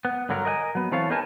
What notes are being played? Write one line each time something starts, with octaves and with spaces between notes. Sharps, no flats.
B3
G2 D3 F#3 A#4
A#4 D#5 F#5 G#5
F#3 B3
E3 C4 A4 C#5 F5 A5
B3 D#4 G#4 A#4 G#5 A5